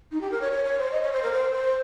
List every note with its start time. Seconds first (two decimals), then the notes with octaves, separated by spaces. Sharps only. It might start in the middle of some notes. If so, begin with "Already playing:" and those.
0.12 D#4
0.21 G4
0.31 A#4
0.41 C#5
0.52 C#5
0.64 C#5
0.79 C5
0.92 D#5
1.03 C#5
1.13 C5
1.23 A#4
1.32 C5
1.52 C5